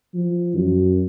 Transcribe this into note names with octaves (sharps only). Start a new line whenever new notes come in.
F3
F#2